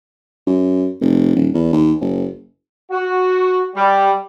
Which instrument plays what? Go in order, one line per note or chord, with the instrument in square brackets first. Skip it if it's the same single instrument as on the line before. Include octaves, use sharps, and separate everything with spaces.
[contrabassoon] F#2
F1
D#1
E2
D#2
F#1
[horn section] F#4
G3